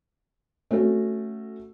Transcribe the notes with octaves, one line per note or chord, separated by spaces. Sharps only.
A3 C#4 F#4 A4